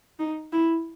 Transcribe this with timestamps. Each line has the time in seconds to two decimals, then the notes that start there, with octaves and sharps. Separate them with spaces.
0.19 D#4
0.52 E4